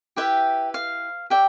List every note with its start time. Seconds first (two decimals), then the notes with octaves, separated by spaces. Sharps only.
0.16 E4 G4 B4 E5 G5
0.74 F5
1.30 G4 D5 E5 G5